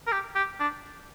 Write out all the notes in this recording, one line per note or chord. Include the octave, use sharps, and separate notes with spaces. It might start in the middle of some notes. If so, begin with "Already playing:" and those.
A#4
G4
G4
D4